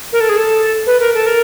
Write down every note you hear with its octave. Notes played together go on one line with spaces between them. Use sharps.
A#4
A4
G#4
A4
B4
A#4
A4
A#4